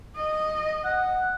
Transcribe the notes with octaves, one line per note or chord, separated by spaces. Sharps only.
D#5
F#5